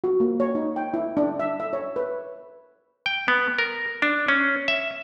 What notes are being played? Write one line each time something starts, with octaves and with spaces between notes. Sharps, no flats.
F#4
A#3
C#5
D#4
G5
E4
D4
E5
E5
C#5
B4
G5
B3
A#4
D4
C#4
E5